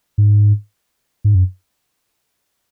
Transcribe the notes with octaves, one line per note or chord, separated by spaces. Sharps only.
G#2
G#2
F#2